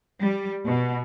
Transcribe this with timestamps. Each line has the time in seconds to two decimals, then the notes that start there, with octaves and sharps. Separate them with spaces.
0.21 G3
0.66 B2